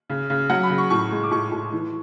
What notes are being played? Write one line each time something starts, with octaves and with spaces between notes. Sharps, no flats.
C#3
C#3
F#3 F#5
B5
C#3
C#6
A2 C#6
G#3
D6
A2 C#6
A2
E3